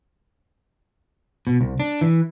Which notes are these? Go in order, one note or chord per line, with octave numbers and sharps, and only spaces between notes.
B2
C2
D4
E3